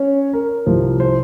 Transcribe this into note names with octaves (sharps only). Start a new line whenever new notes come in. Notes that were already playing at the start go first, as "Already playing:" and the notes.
Already playing: C#4 C#5
A#4
C2 C3 F3
C5